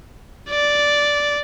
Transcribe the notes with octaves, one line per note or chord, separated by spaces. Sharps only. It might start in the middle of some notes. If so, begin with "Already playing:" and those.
D5